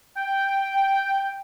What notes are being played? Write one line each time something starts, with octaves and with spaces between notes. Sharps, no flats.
G5